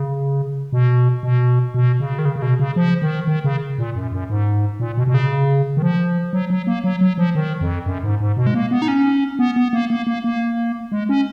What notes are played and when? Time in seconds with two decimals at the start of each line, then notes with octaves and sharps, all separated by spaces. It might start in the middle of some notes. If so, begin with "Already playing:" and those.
Already playing: C#3
0.73 B2
1.23 B2
1.74 B2
2.00 C#3
2.19 D#3
2.25 C#3
2.36 C#3
2.42 B2
2.59 C#3
2.76 F3
3.02 D#3
3.27 D#3
3.44 C#3
3.78 A#2
3.95 F#2
4.12 F#2
4.30 G#2
4.80 A#2
4.97 B2
5.07 B2
5.14 C#3
5.77 D#3
5.82 F3
6.33 F#3
6.50 F#3
6.67 A#3
6.84 F#3
7.01 F#3
7.18 F3
7.35 D#3
7.61 F2
7.86 F#2
8.03 G#2
8.20 G#2
8.37 B2
8.47 G#3
8.54 A#3
8.71 B3
8.82 D#4
8.88 C#4
9.39 B3
9.56 B3
9.73 A#3
9.90 A#3
10.07 A#3
10.24 A#3
10.92 G#3
11.09 C#4